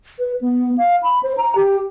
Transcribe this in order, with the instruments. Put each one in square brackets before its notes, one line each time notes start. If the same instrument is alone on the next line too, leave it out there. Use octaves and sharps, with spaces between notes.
[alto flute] B4
B3
F5
B5
C5
A#5
G4